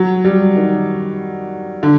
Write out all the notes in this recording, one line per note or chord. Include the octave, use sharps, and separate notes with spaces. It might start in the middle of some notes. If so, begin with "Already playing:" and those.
Already playing: F#3
G3
D#3
D3